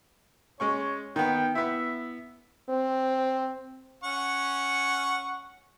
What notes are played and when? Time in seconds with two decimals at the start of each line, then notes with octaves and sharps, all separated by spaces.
0.60 G#3 C#4 C#5 C#6
1.16 D#3 B3 G5
1.55 B3 E4 E5
2.69 C4
4.04 C#4 F#5 C#6